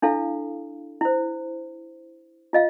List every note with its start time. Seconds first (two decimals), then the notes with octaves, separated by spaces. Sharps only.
0.02 D4 E4 A4 F5
1.01 E4 C5
2.53 F4 D#5 F5